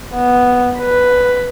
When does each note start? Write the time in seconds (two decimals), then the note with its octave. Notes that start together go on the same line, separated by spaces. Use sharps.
0.14 B3
0.78 B4